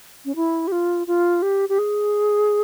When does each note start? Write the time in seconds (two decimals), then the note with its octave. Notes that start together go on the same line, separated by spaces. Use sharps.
0.25 C#4
0.35 E4
0.67 G4
0.72 F4
1.07 F4
1.42 G4
1.69 G4
1.78 G#4